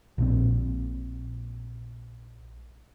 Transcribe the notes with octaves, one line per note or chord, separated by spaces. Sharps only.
A#1 A#2 C4